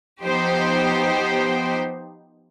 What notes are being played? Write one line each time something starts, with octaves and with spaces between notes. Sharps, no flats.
F3 B3 D#4 G4 C5